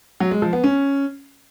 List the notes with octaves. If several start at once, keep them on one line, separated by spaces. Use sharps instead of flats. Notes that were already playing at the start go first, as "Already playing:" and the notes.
F#3
G#3
F3
B3
C#4